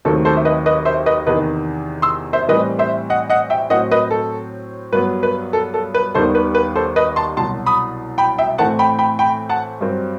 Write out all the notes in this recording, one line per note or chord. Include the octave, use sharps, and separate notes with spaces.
D#2 D#3 F#3 A3 C4 A4
A4 C5
E5
B4 D#5
B4 D#5
C5 E5
B4 D#5
E2 C3 D#3 B4 D#5
C6 E6
C5 E5
A2 E3 G3 C4 B4 D#5
C5 E5
D#5 F#5
D#5 F#5
E5 G5
A2 F#3 C4 D#5 F#5
B4 D#5
A4
G2 F#3 B3 B4
B4
A4
A4
B4
D#2 D#3 G3 B3 A4 C5
B4
B4
A4 C5
B4 D#5
A5 C6
C2 B2 F#3 A5 C6
B5 D#6
G5 B5
E5 G5
A2 E3 A3 C4 F#5 A5
G5 B5
G5 B5
G5 B5
F#5 A5
G2 F#3 C4